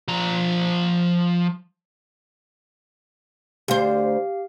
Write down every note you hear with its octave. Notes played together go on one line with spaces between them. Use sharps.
F3 A#5
D2 G4 C5 F5